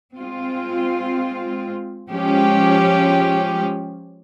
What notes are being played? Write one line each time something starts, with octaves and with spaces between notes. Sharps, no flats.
G#3 C4 F4
F3 G#3 C#4 G4